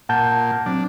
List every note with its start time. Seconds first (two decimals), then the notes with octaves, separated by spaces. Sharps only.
0.09 A#2 F#5 A5 G6
0.66 F#3 C4 D4